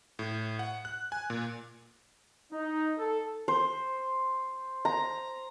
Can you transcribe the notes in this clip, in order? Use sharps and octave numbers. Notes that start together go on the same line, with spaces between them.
A2
F#5
F#6
G#5
A#2
D#4
A4
C5
A#5